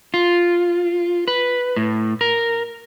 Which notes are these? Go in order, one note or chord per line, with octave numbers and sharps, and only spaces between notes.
F4
B4
A2
A#4